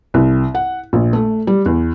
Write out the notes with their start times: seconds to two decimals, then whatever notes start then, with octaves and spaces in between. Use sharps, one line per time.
0.14 C2
0.55 F#5
0.93 A#1
1.13 A3
1.47 G3
1.66 E2